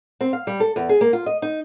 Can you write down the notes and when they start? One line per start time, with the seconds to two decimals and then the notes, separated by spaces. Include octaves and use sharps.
0.21 C4
0.33 F5
0.47 G3
0.60 A4
0.76 E2
0.89 G#4
1.01 A#3
1.13 F4
1.26 D#5
1.42 D#4